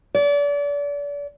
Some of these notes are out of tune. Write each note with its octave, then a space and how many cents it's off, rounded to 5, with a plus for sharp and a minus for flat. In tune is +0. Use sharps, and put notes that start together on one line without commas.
D5 -35